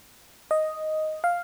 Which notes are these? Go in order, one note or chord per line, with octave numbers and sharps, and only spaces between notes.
D#5
F5